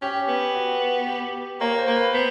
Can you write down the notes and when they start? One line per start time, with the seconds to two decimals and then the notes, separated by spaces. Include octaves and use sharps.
0.02 C#4 G4
0.28 B3
0.55 F#4
1.07 G4
1.60 A#3 C#5
1.78 C5
1.87 A#3
1.96 B4
2.13 B3 C5